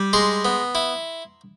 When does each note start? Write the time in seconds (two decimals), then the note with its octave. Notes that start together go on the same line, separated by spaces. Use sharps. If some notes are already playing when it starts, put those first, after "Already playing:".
Already playing: G3
0.13 G#3 A#5 C6
0.45 B3
0.75 E4